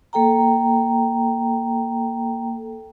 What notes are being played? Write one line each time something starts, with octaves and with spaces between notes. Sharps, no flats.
A#3 A4 G5 A#5